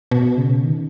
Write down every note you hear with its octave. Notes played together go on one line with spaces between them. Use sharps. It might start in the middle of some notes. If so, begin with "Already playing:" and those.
B2
C#3
D#3